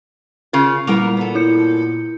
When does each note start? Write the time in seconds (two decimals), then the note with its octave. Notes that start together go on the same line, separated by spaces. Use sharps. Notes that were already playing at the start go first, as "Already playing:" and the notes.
0.53 C#3 F4 A#4
0.87 A#2 G3 A#3 B3 A#4 F7
1.17 B3 A4
1.35 E4 G6 C#7